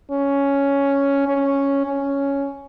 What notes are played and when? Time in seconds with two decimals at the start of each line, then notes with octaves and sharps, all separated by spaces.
0.12 C#4
1.28 C#4
1.86 C#4